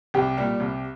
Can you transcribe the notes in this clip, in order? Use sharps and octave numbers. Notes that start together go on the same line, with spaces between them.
C2 G4
A#2 G3
C2